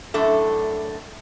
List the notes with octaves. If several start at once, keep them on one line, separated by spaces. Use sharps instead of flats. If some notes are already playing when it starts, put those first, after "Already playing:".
F#2 A2 D4 A4 E5